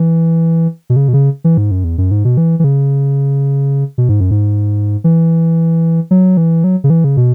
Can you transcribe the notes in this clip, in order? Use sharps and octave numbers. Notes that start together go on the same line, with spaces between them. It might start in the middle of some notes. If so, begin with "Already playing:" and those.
Already playing: E3
B2
C#3
B2
C#3
E3
G#2
F#2
E2
F#2
G#2
B2
E3
E3
C#3
B2
G#2
F#2
G#2
E3
F#3
E3
F#3
C#3
E3
C#3
B2